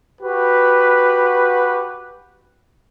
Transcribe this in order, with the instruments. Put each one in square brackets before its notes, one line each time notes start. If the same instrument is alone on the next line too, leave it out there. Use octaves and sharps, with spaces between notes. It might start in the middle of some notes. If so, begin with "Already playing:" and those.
[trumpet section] F#4 G4 B4